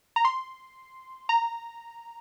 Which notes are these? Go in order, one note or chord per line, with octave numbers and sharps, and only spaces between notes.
A#5
C6
A#5